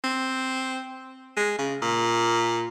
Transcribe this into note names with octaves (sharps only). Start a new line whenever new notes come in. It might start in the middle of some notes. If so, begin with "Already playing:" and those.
C4
G#3
C#3
A#2